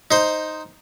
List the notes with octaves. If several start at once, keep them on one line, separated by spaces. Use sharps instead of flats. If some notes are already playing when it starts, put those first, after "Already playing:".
D#4 C5